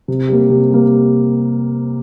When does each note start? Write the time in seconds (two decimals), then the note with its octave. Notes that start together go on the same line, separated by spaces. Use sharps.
0.08 C3
0.28 G3 A#3
0.50 C3
0.71 G3 A#3